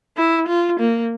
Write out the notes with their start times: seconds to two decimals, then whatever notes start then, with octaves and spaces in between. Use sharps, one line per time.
0.17 E4
0.48 F4
0.80 A#3